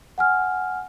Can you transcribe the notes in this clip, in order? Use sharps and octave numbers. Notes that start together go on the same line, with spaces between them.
F#5 G#5 F6